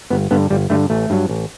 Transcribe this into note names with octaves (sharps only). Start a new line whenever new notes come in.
G1 B3
G2 D3 B3
G1 G3
G2 D3 A3
A1 A3
G2 F#3
A1